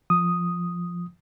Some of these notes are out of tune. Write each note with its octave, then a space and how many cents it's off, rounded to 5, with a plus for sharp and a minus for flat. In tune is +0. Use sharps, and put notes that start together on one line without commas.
F3 +0 D#6 +0